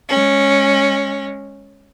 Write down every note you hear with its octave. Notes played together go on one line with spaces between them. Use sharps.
G#3 C#4